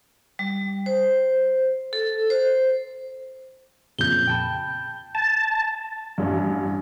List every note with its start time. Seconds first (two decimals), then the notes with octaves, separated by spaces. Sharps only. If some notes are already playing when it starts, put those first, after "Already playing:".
0.39 G3
0.86 C5
1.93 A4
2.30 C5
3.99 F2 A#2 C#3 G6 G7
4.27 G5 A5 B5
5.15 A5
6.18 A1 G2